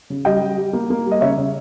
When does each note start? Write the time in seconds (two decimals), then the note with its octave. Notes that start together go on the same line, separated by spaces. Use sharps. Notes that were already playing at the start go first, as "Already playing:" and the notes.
0.10 C#3
0.25 G3 D#5 G5
0.41 G3
0.58 G3
0.73 A#3
0.90 A#3
1.06 G3
1.12 D#5
1.21 C#3 C#5 E5
1.37 C#3